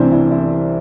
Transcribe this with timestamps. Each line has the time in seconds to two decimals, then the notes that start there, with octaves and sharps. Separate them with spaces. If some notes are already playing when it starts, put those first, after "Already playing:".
Already playing: C2 C3 E3 A3 C4 D4 E4 C5
0.12 E4
0.31 E4